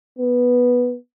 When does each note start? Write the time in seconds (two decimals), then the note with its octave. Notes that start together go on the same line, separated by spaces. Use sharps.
0.18 B3